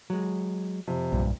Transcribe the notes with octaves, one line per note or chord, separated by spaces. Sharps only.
F#3 G#3
F2 C3
B1 G2 A#2